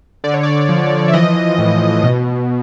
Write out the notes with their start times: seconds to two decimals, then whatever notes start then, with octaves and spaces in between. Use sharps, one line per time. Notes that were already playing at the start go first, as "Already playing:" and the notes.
0.24 D3 D5
0.34 C#5
0.43 D5
0.69 F3
1.08 E5
1.14 E3 D#5
1.58 A2
2.04 B2